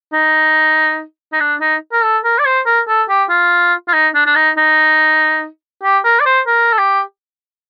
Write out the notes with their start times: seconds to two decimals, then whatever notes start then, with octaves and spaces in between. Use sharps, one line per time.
0.13 D#4
1.33 D#4
1.40 D4
1.61 D#4
1.93 A#4
2.03 A4
2.24 A#4
2.39 D5
2.46 C5
2.66 A#4
2.88 A4
3.09 G4
3.29 F4
3.88 F4
3.93 D#4
4.14 D4
4.26 D4
4.35 D#4
4.57 D#4
5.84 G4
6.04 A#4
6.20 D5
6.26 C5
6.47 A#4
6.72 A4
6.78 G4